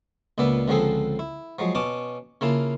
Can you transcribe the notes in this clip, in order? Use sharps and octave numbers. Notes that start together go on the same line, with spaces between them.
C#2 A#2 B3 D5 E5
C#2 D3 F3 C4 G#4 A4
E4
F3 F#3 G#3
B2 C#4 A5 D6 D#6
C#3 A#3 E4 F4 A5